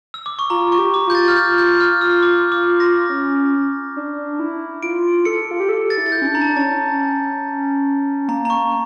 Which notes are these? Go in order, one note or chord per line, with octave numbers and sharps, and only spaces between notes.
E6
D6
C#6
F4 A#5
C#6
G4
D6
F4 G6
A6
F6
G6
G6
F6
E6
D6
D6
A#6
C#4
D4
E4
F4 D7
A4 C#7
F4
G4
A4
A6
E4
A6
G6
C#4
D4
A#5
A5
D4
C#4 A5
A#3 A#5
A#5
C#6